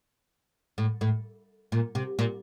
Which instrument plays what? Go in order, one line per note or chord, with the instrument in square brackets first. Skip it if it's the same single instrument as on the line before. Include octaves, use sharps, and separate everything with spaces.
[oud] A2
A2
A#2
C3
A#2